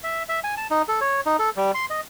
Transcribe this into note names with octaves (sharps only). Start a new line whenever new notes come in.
E5
E5
G#5
A5
D#4
A4
C#5
D#4
A4
G3
C6
D#5